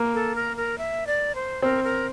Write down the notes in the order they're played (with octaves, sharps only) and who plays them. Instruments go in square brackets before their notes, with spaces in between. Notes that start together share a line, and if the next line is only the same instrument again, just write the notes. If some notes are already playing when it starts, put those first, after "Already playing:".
Already playing: [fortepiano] A#3
[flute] A4
A#4
A#4
E5
D5
C5
[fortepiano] C4 [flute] A#4
[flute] A#4